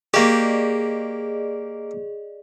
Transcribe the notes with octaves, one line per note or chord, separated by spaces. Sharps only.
A#3 G4 G#4 D5 D#5